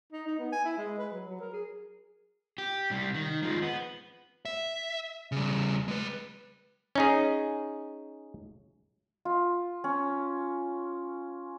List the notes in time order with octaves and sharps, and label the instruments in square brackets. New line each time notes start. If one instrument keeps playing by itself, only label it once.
[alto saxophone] D#4
D#4
B3
G#5
E4
G#3
B4
F#3
F#3
A#4
G#4
[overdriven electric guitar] G4
C2 G3
D#3
F3 G#3
B3
[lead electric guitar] E5
C#3 G3
G#3 B4
[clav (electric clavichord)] C#4 D#4 G#4
[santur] F4
C#4